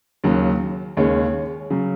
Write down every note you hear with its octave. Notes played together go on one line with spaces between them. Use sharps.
D#2 C#3 F#3
D#2 C#3 G#3 C#5
C#3 F#3